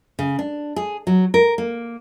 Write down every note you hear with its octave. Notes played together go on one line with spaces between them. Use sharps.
C#3
D4
G#4
F#3
A#4
A#3